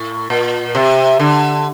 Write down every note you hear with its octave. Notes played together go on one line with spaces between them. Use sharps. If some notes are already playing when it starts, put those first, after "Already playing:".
Already playing: A2
A#2
C3
D3